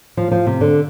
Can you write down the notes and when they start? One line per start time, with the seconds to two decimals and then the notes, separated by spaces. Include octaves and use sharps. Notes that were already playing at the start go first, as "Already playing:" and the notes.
0.17 F3
0.31 F3
0.47 C3
0.61 D3